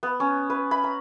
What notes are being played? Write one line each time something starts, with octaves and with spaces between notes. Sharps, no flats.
B3
C#4
B4
B5
A#5